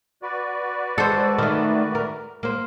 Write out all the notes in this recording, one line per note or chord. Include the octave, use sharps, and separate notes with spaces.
F#4 B4 D5
G#3 A4 C5
D#3 A3
A#4
A#3 C5